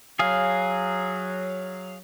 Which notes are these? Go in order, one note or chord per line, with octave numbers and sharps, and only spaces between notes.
F#3 G#4 F5